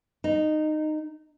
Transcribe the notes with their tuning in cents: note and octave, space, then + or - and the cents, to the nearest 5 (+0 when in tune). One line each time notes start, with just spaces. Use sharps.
D#4 -15